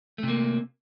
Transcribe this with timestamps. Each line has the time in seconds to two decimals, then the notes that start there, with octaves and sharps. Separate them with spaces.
0.18 A3
0.23 C3
0.28 A#3